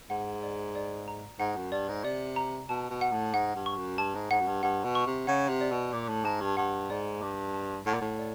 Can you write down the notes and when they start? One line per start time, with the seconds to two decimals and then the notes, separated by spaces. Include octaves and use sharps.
0.10 G#2 F#5
0.43 D5
0.75 D5
1.08 A#5
1.39 G#2 F#5
1.56 F#2
1.72 G2 D5
1.89 G#2
2.04 C3 D5
2.36 A#5
2.69 B2 A5
2.91 B2
3.01 F#5
3.12 A2
3.34 G#2 F#5
3.55 G2
3.66 C#6
3.77 F#2
3.98 G2 A5
4.15 G#2
4.31 G#2 F#5
4.41 F#2
4.47 G2
4.63 G2 F#5
4.84 B2
4.95 C#6
5.07 C3
5.27 C#3 F#5
5.49 C3
5.61 D5
5.72 B2
5.93 A#2 D6
6.09 A2
6.25 G#2 A5
6.41 G2
6.57 G2 F#5
6.90 G#2 D5
7.21 G2 D6
7.54 A5
7.86 A2 F#5
7.94 A#2
8.01 A2
8.19 D5